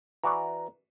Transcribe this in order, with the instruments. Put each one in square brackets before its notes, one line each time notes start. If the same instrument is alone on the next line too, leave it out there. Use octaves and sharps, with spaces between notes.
[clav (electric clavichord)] E3 F#4 D5 [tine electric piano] A#5